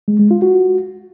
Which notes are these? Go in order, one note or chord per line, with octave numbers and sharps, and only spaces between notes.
G#3
G#3
F4
F#4